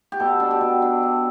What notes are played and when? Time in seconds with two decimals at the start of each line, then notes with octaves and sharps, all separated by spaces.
0.12 G4
0.20 B2 A4
0.40 D4
0.51 G4
0.61 B2
0.82 D4
1.03 D4